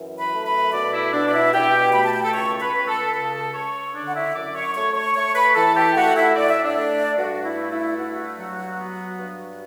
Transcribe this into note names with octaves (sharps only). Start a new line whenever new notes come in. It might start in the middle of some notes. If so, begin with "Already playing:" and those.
Already playing: F#2 E3
B4 B5
A3
B4 B5
B2 D5 D6
E4 E5
B2 D4 D5
D5
E4 E5
B2 G4 G5
A3 B5
A5
G5
A4 A5
C#2 C#5 C#6
C#6
B4 B5
C#2
A4 A5
C#3 A4 A5
C#3 C#5 C#6
D3 D4 D5
F#5
E4 E5
F#2 D5 D6
C#5 C#6
A3 C#5 C#6
C#5 C#6
A3 C#5 C#6
B4 B5
E3 A4 A5
G4 G5
A3 F#4 F#5
E4 E5
A2 D5
E5
D4 D5
A3
G2 F#4
E4
A3
E4
G2 F#4
F#3
B3
G2